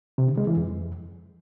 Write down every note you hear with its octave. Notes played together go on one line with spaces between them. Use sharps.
C3
D3
G#3
E3
F2